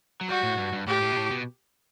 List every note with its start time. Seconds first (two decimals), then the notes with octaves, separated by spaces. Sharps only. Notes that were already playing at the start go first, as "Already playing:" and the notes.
0.21 F#3
0.29 G3 F#4
0.43 A2
0.58 G2
0.73 G2
0.87 A2 G4
1.02 A2
1.12 B2
1.17 A2
1.31 B2